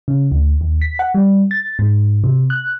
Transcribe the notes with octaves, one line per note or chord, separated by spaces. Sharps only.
C#3
D2
D#2
B6
F#5
G3
A6
G#2
C3
F#6